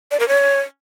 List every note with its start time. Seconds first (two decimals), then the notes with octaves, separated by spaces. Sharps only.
0.11 D5
0.20 A#4
0.28 C#5